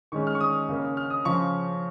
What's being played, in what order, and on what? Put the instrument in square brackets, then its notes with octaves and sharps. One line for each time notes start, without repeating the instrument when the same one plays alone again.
[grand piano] D#3 G#3 C#4 C#6
F6
C#6
D#6
C#3 A#3 C#4
F6
D#6
C#3 F3 C#4 C#6